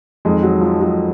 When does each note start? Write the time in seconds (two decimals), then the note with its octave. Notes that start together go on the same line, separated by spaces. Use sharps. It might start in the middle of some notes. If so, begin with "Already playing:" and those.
0.25 F2 D#3 G#3
0.43 F#3
0.61 F3
0.81 F#3